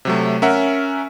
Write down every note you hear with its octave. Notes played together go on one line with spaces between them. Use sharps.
C3 F#3 A3
C#4 A#4 E5 F#5